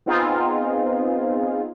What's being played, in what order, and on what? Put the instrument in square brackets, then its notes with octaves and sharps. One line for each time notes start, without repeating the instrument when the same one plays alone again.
[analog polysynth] B3 C4 D#4 F4 G#4